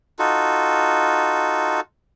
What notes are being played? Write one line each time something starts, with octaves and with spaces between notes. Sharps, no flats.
D#4 F4 F#4 A4